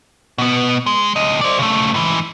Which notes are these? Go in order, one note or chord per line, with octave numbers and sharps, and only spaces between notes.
B2 B3
G#3
D2 D#5
C5 D5
C#3 A3
G#2 E3